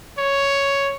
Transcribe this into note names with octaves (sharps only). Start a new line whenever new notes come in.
C#5